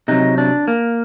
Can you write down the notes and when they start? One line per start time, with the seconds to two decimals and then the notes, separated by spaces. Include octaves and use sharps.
0.08 C3 F#3 D#4
0.38 D4
0.68 A#3